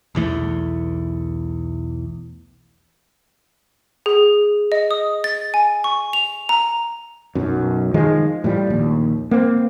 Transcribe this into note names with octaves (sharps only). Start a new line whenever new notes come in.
B1 E2 E3 A3
G#4
D#5
D#6
A6
G#5
C#6
F7
A#5
B1 F#2
D#3 F3 G#3
A2 F3 G3
A#1 D#2
A#3 C4